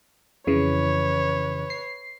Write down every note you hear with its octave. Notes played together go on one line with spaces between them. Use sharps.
F2 C#3 E3 B4 C#5
C7